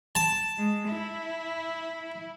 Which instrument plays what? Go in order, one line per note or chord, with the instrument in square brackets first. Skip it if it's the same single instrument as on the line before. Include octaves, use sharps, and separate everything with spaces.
[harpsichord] A5
[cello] G#3
E4